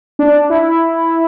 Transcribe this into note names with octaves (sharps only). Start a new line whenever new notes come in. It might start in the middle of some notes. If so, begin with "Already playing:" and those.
D4
E4